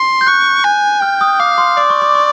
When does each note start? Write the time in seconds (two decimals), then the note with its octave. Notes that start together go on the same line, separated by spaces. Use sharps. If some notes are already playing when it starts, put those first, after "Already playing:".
Already playing: C6
0.21 G6
0.27 C#6 F#6
0.64 G#5
1.01 G5 F6
1.21 D#6
1.40 F5 D6
1.58 C6
1.77 D5 D6
1.90 C#6
2.02 D6
2.15 C#6